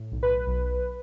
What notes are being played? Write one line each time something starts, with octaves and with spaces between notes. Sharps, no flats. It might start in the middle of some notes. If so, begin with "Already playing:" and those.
Already playing: A2
B1
B4
B1